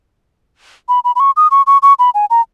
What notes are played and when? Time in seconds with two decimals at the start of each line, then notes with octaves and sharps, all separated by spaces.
0.89 B5
1.04 B5
1.16 B5
1.20 C#6
1.37 D#6
1.51 C#6
1.67 C#6
1.82 C#6
1.99 B5
2.14 G#5
2.30 A#5